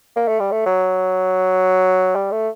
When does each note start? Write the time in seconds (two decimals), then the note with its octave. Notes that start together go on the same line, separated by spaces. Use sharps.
0.16 A#3
0.28 A3
0.40 G3
0.52 A3
0.66 F#3
2.15 G3
2.31 A3